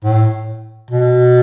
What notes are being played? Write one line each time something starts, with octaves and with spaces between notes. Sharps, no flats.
A2
B2